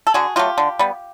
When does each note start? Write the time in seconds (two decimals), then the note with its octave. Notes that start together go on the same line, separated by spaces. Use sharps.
0.07 A4
0.14 D3 F#4 G#4
0.36 F#3 A3 F4 G4
0.58 D3
0.79 G3 B3